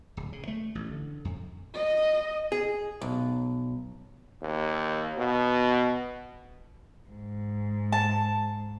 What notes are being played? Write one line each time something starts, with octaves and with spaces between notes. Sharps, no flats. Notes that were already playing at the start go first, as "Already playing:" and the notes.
D1
C#3
A3
A1
D3
F2
D#5
G#4
B1
D#2
B2
G#2
A5